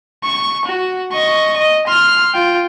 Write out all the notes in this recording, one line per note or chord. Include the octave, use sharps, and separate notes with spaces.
C#6
F#4
D#5 C#6
D#5
C6 F6
F4 G5